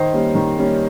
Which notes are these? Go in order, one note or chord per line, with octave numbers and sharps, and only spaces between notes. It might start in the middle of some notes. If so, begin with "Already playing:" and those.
Already playing: D#3 C5 D#5
G3 A#3 C#4
D#3
G3 A#3 C#4